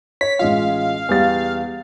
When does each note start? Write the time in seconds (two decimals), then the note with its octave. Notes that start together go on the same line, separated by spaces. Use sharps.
0.21 C#5 B6
0.39 A1 G#3 F4 F5
1.09 E2 G3 A6